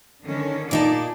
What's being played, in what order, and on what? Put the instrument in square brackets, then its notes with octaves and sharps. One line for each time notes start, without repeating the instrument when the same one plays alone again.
[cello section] D3 D#3 C#4
[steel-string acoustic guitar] A#2 D#4 A5 [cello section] G#4 D5